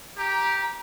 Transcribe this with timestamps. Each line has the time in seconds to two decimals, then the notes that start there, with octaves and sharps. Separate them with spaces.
0.18 G4 A#5